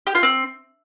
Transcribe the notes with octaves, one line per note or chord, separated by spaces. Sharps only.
G4
F4
C4